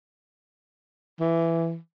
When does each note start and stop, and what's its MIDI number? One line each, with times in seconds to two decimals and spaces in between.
1.20 1.77 52